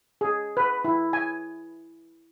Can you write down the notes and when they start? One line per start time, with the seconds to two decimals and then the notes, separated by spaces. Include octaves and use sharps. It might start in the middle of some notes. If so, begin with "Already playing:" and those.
0.21 G#4
0.57 B4
0.85 E4
1.13 G#5